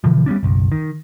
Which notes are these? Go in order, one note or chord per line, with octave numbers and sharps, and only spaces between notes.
B2 D3 E3 F3
G3 B3 C#4 D4
F#1 B1
D#3